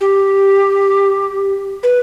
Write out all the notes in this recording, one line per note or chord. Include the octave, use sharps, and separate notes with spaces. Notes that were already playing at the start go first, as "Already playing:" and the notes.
G4
B4